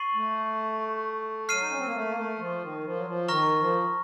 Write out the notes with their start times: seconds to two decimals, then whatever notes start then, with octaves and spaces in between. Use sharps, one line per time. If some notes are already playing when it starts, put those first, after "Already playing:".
Already playing: C#6 A6 C7 D#7 F#7
0.14 A3
1.49 F#3 F6 C7 D#7
1.61 D#4
1.69 C#4
1.78 C4
1.86 A#3
1.94 A3
2.08 A#3
2.16 A3
2.39 F3
2.61 D#3
2.84 F3
2.95 F#3
3.06 F3
3.28 D#3 A#5 C#6 F6 A#6
3.59 F3